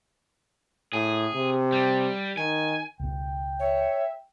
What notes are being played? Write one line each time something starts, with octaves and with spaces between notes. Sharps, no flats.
A2 G#4
C3
G3
D#3 G#5
C#2 B2 G5
C#5 E5